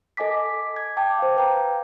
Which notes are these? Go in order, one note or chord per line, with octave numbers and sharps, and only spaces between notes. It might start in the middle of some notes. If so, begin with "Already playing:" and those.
A4 D#5 G#5 D6 B6
G#6
G5 A5 D6
C5 F5
B4 G5 A#5